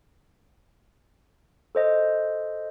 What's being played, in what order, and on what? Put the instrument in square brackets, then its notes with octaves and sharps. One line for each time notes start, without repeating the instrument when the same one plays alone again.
[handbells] A4 C5 D#5